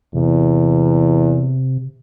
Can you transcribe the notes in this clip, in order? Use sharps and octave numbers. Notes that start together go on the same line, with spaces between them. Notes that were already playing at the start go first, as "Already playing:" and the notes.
E2 C3